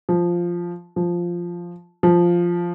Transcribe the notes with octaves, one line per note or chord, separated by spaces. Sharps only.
F3
F3
F3